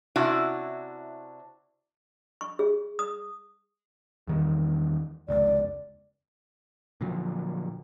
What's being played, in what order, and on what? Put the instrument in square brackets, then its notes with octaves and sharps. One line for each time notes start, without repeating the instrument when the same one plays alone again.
[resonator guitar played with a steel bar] C3 C#4 D4 E4 F#4
[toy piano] C#6
G#4
D#6
[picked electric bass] E2 D#3 G3
[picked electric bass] F1 C#2 [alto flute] D5
[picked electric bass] A#2 D3 F3 F#3